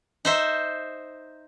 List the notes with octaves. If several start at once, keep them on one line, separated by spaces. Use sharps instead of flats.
D#4 C5 E5